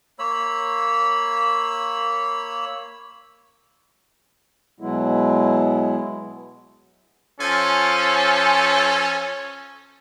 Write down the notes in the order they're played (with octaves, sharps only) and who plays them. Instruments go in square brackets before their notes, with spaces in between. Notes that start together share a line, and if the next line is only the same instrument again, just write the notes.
[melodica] A#3 C#5 B5 E6
[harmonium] B2 F#3 G#3 B3 E4
[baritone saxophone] F3 [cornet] C#4 [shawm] A4 [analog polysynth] G#5